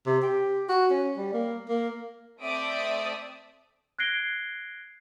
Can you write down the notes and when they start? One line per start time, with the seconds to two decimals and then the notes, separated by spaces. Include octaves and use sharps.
0.06 C3
0.23 G4
0.69 F#4
0.91 C#4
1.17 G3
1.33 A#3
1.69 A#3
2.39 A3 C4 D5 E5 D#6 D7
3.99 F#6 G#6 A#6 C7 D7 G7